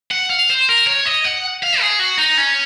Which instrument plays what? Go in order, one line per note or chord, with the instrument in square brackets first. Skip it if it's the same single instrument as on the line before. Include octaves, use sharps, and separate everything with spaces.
[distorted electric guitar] F#5
F5
C5
A#4
C#5
D#5
F#5
F5
G#4
F#4
D#4
C#4